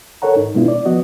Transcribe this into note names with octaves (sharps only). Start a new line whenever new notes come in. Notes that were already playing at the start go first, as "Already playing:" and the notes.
A4 A#4 C#5 F#5 A#5
G#2 D#4
B2 G#3 B3 D4 E4 F4
D5
F3 B3 F#4 D#5